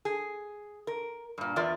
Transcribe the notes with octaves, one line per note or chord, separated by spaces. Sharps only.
G#4
A#4
G2 A#2
E2 F4 A#4 D5 E5